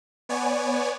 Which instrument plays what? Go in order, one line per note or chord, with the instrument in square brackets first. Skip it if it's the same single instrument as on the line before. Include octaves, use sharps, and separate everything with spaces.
[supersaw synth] B3 C#5 D5 G#5